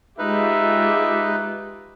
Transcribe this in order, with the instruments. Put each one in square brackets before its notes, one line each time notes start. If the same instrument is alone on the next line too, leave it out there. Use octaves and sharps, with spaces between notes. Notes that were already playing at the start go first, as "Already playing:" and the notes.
[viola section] G#3 F4 G4 [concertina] D#4 B4 [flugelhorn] E5